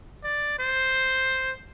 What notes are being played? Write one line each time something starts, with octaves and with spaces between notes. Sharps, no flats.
D5
C5